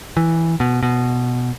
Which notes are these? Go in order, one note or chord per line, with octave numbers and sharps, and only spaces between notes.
E3
B2
B2